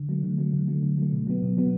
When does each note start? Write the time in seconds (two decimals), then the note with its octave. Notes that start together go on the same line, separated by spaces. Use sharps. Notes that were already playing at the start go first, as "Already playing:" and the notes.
Already playing: D3
0.09 F#3 A3
0.23 D3
0.38 F#3 A3
0.53 D3
0.68 F#3 A3
0.83 D3
0.98 F#3 A3
1.13 B2
1.27 F#3 B3
1.42 B2
1.57 F#3 B3